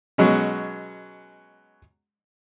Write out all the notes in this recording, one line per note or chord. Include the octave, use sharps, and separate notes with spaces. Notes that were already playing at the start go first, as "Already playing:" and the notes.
B2 F#3 G#3 C#4